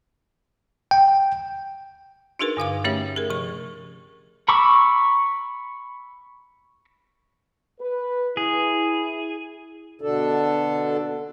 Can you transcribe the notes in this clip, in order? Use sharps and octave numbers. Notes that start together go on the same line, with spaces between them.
G5
D4 D#4 F#4 G#4 A#4 B4
G2 D3 F5 D6
A3 C#4 G4 C#5 E5
G#4 A#4
C3 F3 C#6
A#5 B5 C#6 D6 E6
B4
E4 G#4
B2 D3 D4 A4